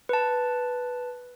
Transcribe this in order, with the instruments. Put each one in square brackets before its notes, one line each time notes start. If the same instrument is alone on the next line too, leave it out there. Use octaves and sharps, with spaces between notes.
[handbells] B4 A5